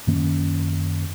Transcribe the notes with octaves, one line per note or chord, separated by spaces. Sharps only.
F#2 D#3 A#3 C#4